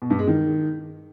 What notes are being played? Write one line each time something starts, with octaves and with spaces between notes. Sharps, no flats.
B2
G2
G#3
D#3